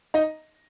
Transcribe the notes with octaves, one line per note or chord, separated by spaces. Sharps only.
D#4 D#5